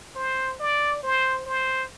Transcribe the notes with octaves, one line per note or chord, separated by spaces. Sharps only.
C5
D5
C5
C5